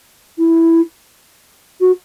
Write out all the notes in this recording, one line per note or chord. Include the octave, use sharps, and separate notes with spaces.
E4
F#4